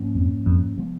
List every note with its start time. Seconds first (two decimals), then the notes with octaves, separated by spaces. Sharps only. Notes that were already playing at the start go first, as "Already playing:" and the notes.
Already playing: G#2 F3 A#3 C#4
0.15 F2
0.46 F2
0.77 C3 F3 G#3 B3